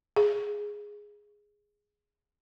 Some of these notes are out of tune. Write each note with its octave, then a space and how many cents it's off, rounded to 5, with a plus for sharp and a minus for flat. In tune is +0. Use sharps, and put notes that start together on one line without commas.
G#4 +0